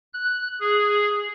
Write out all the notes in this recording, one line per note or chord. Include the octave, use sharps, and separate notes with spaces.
F#6
G#4